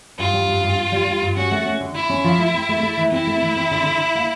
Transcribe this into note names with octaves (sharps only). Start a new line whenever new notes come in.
G2 F4
G3
G2
G2
G2
G3
G3
G2
C#4 F#4
A3
C#4
D3
D3 E4
C#4
F3
A3
C4
A3
A3
E3
C4 E4
A3
E3
C4
D3
D3
D3
A#3